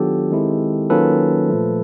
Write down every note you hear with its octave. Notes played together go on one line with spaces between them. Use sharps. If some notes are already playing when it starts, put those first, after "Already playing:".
Already playing: D#3 F#3 B3 D4 F4 G4 A4
D#3 G#3 C4 E4
D#3 F#3 A#3 C#4 F4 A4 B4
A#2 F3 A3